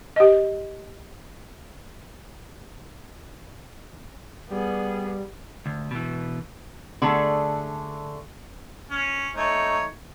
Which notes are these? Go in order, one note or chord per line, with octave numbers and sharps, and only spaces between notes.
G4 D#5
G3 B3 G#4
D2
B2 E3
D3 A3 G#4 A4 A5
C#4
A3 D#4 C#5